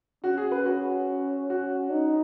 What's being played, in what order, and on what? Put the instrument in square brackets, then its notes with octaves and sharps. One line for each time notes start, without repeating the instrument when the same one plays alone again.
[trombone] C#4 [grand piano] F#4
[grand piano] G#4
B4
F#4
F#4
[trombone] D#4